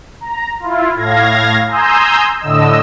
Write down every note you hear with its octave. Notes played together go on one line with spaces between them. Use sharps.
A#5
E4 F4
A2 F5 G#6 A#6
G#5 A#5 C6 D#6 E6 G6
A2 D3 D#5 E6